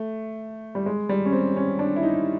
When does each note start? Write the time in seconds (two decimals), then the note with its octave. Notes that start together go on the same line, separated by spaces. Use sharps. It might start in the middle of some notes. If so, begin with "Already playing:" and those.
Already playing: A3
0.75 G3
0.86 G#3
1.09 G3
1.26 C#4
1.32 C4
1.56 C#4
1.79 D4
1.96 E4
2.03 D#4